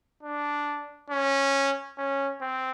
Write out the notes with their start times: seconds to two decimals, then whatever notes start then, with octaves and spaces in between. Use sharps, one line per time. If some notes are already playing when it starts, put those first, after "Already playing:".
0.23 D4
1.10 C#4
1.98 C#4
2.41 C4